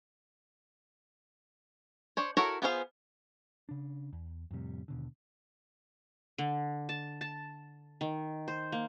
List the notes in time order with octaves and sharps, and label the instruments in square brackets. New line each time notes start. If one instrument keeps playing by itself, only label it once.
[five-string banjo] D4 C5 C#5
E4 F#4 A4 A#4 C#5
B3 F4 G#4 C5 F5
[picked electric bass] C#3 D4
E2
F2 A2 C3 G3
D#2 B2 D3
[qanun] D3
A5
A5
D#3
C5
A#3